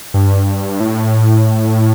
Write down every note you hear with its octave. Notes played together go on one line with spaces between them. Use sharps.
G2
A2